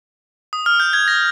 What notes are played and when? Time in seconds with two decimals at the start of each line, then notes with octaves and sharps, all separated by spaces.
0.53 D#6
0.66 F6
0.80 G6
0.93 G#6
1.08 A#6